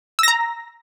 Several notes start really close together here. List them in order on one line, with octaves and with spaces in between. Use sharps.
E6 A#6 A#5